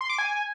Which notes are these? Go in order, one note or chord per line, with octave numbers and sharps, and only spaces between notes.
C6
D6
G#5